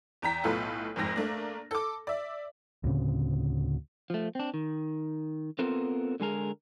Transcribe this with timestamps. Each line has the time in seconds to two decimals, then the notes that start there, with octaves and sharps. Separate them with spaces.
0.22 E2 G5 A#5 B6
0.44 B1 A2 B3 F4 A4
0.96 F#1 F2 G#2 A#6
1.16 A3 A#3 D4
1.71 A4 D6
2.07 D5 E5
2.84 D2 A2 C#3 C4
4.10 F3 A3
4.35 C4 D4
4.54 D#3
5.59 B3 C4 F4 A4 A#4 C5
6.20 D3 G#3 G#4 A#4